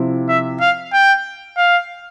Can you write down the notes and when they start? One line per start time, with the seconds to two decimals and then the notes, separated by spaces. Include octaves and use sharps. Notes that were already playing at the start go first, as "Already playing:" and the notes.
Already playing: C3 F3 C4 E4
0.29 E5
0.61 F5
0.93 G5
1.57 F5